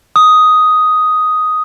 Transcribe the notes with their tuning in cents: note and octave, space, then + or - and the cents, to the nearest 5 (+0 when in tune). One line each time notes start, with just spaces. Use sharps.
D#6 +5